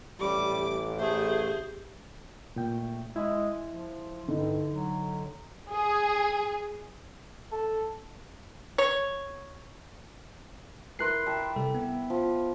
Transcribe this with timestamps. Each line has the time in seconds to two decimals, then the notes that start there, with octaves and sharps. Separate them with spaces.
0.20 A1 G3 G4 D6
0.99 A3 G4 G#4 C5
2.56 A#2 A3 G5
3.16 G#3 E4
3.68 F3
4.28 G2 D3 D#4
4.69 F#3
5.71 G#4
7.52 A4
8.78 C#5
10.99 E4 A#4 B4 C6 F#6 C7
11.27 G4 E5 A5
11.56 C3 G3 A4
11.75 B3
12.10 F3